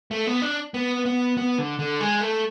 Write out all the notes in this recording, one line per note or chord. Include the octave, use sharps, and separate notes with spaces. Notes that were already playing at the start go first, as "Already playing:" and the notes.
A3
B3
D4
B3
B3
B3
D3
D3
G#3
A3